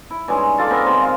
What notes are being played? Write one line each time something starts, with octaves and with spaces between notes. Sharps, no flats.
E4
G2 C#3 G#3 D#4
F4 A4 D5 A5
B3 C4 A#4 C6
C3 D#3 G#3
F4 F5